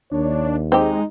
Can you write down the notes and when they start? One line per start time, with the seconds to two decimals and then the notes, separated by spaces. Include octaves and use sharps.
0.11 D#2 D4 C#5
0.72 G#3 C4 D#4 G4